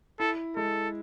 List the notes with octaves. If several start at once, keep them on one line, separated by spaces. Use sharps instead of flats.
E4 A4
G#3 A4